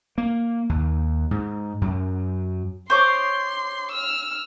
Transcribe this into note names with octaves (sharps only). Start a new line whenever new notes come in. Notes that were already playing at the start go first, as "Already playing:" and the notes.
A#3
D#2
G#2
F#2
C5 C#5 C6 D6
E6 F6